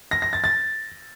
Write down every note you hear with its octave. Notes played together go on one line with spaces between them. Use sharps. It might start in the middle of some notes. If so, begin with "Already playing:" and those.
A#6
A#6
A6
A6